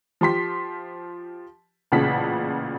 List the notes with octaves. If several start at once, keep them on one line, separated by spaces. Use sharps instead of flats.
F3 G4 C6 B6
A1 A#2 C#3 F#5 A5 B6